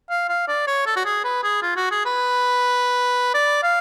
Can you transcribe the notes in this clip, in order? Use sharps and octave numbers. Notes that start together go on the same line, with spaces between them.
F5
F5
D5
C#5
A4
F#4
G#4
B4
G#4
F4
F#4
G#4
B4
D5
F5